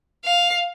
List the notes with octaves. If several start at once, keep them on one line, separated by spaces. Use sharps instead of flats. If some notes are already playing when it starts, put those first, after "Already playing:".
F5